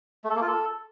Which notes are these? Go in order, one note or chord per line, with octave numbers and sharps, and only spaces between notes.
A3
A4
A#3
F4
A4